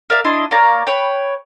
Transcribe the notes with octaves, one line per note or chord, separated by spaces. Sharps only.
A#4 D5 E5 F5
D4 E4 D#5 C6
A#3 C#5 D5 A#5
B4 C#5 G5